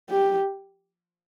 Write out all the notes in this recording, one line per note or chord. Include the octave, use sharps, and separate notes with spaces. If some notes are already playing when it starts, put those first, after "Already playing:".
G4